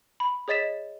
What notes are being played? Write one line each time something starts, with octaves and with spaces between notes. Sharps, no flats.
B5
G#4 C#5 D#5 A6 B6 E7